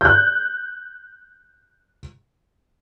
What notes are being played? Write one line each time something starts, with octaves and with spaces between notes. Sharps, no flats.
F#6 G6